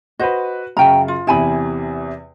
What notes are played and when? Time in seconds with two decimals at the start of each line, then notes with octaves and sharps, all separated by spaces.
0.19 F#4 B4 C5 D#5
0.77 F#2 C#3 G5 A#5
1.08 F4
1.27 E2 C3 E4 G#5 B5